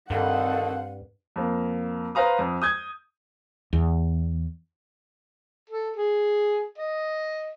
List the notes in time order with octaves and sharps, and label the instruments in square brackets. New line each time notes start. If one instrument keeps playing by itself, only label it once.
[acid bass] G2 [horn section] D3 D#3 A4 [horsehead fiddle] C4 F#5 [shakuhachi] F5
[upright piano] F2 A#3
B4 C5 F5 A#5 D#6
F2
D#6 G6 G#6
[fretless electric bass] E2
[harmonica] A4
G#4
D#5